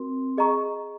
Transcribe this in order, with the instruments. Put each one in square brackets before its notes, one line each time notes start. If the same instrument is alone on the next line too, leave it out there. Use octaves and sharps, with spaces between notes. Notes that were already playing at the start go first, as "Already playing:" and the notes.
Already playing: [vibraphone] C4 [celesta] F#4 A#4
[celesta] G#4 D#5 A#5 C#6